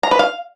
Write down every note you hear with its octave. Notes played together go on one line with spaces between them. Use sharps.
A#5
B4
F5